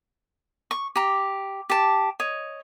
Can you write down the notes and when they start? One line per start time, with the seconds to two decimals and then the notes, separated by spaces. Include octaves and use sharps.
0.71 C#6
0.96 G4 A#5
1.70 G4 A5
2.20 C#5 D#5